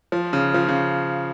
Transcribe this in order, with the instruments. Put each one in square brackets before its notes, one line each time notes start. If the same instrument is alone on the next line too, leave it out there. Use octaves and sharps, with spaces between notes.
[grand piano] F3
C#3
F3
C#3